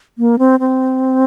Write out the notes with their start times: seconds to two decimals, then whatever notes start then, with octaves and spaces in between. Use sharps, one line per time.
0.18 A#3
0.39 C4
0.60 C4